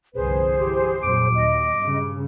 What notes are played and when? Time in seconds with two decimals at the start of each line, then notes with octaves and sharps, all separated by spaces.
0.15 G1 C2 F2 G#4 B4 C5
0.59 E3 G4
1.03 F2 A#2 F#3 D6
1.35 D#2 D#5
1.78 G2 C#3